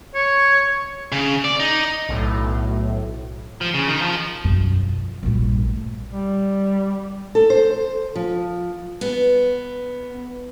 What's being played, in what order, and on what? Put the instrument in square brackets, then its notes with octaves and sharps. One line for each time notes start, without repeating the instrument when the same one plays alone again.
[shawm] C#5
[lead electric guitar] C#3
D5
D#4
[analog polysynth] B1 A2
[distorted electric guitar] F3
C#3
D#3
F3
[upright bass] B1 F#2
F3
A#1 G2
A3
[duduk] G3
[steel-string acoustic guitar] A4
C5
F3
B3